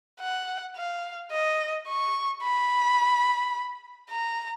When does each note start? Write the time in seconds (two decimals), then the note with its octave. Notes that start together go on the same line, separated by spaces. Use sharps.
0.20 F#5
0.76 F5
1.32 D#5
1.88 C#6
2.43 B5
4.10 A#5